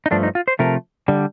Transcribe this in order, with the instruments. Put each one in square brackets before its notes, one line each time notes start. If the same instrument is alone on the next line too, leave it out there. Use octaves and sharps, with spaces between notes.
[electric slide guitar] D#4
G2 F3 A3 D4
D#4
F4
C5
C3 F3 A3 A#4
D3 G3